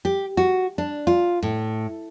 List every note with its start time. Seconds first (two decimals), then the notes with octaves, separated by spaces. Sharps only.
0.05 G4
0.37 F#4
0.78 D4
1.07 F4
1.43 A2